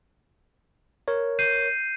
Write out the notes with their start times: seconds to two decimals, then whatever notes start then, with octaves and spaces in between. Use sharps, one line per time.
1.08 A#4 C#5
1.39 G6 C7 D#7